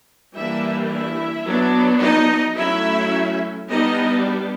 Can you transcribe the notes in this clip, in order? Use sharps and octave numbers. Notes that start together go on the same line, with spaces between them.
E3 G3 A#3 D4 E4 E5
E4 E5
F#3 B3 D4
D#4 D#5
F#3 A3 C#4 E4 E5
G3 B3 D4 D#4 D#5